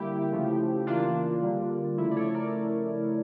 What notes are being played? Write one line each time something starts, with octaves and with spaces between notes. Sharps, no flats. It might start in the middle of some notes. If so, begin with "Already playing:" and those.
Already playing: D3 G3 A#3 E4 G4
C#3 F3 A3
C#3 E3 A#3 D4 F4
D3 G3 A#3
C#3 F3 A3 E4
D5
A4 C#5
A#4 D5